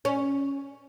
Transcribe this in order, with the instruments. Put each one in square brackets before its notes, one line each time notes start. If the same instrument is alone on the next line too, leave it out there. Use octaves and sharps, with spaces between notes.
[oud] C#4